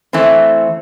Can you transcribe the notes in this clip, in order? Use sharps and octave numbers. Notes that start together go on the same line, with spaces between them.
E3 A3 C4